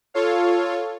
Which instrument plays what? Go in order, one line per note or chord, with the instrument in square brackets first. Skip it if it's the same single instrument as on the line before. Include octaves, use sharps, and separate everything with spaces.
[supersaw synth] F4 A4 C#5 F5